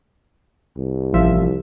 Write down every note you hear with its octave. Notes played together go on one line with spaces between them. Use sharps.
C2
A1 F3 E5